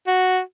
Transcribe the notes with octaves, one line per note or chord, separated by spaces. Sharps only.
F#4